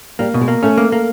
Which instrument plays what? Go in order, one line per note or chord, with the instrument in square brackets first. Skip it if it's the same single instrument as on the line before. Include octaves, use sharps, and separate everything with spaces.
[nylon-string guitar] G3 [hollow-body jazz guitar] A#3
[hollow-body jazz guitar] B2
[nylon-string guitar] G#3
[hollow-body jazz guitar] A#3
[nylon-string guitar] A3 [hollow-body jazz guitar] C#4
[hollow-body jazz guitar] A#3
A#3